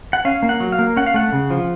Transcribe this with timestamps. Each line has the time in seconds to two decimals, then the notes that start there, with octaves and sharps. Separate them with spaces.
0.13 F#5
0.25 C#4 F5
0.43 A#3
0.49 F#5
0.60 F#3
0.72 F5
0.79 A#3
0.97 C#4 F#5
1.06 F5
1.14 A3 F#5
1.33 C#3
1.50 F3